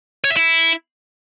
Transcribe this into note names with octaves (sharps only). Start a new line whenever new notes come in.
C#5
E5
E4